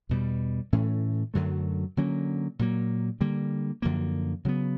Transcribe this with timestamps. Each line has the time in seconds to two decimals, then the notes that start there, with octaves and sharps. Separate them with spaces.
0.09 E2 B2 G3
0.73 A2 E3 A3 C#4
1.34 F#2 D3 F#3 A3
1.97 D3 F#3 A#3 C#4
2.59 A#2 F#3 A#3
3.21 D3 G3 A#3
3.82 F#2 D3 F3 A#3
4.45 C#3 F#3 B3